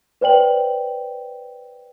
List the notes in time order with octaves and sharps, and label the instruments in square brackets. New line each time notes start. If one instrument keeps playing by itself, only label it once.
[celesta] B4 C5 D5 G5 F#7